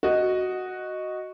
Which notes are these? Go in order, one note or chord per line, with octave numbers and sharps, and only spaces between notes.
F#4 D#5